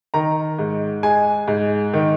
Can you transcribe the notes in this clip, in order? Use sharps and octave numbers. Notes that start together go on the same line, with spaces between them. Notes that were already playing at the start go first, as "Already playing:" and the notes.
D#3 A#5
G#2
G#3 G#5
G#2
D#3